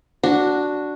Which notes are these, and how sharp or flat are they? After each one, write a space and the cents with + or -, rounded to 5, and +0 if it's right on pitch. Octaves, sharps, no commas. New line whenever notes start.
D4 +0 F#4 +0